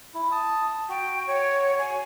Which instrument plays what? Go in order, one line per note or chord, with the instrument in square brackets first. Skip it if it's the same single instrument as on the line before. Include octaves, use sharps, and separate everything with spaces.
[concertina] E4
A5 D#6
[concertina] F#4 [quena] G5
[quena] C#5
G#5